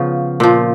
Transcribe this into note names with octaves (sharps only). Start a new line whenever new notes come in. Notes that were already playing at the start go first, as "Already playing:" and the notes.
Already playing: C#3 F3 B3 C#4
A#2 F3